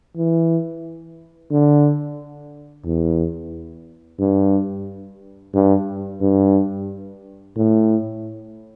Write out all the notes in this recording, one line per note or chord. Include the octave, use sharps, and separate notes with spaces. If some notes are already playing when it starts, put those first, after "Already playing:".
E3
D3
E2
G2
G2
G2
A2